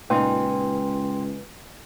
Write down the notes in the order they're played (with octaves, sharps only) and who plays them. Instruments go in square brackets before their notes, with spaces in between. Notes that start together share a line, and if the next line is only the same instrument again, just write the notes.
[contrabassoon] C#2 [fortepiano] A#2 D#4 [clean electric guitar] B4 G#5 [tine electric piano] G5 C6